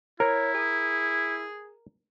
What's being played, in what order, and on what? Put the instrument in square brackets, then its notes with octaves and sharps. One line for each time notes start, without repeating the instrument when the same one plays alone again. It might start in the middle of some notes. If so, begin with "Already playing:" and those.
[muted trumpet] E4 [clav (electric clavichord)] A#4 [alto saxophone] C#5
[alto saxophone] G#4